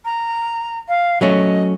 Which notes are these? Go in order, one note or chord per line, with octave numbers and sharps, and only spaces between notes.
A#5
F5
F#3 A3 C#4 D#5